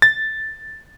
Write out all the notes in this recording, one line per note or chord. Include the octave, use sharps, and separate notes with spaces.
A6